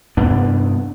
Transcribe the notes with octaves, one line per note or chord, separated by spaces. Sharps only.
G2 C3 B3 D4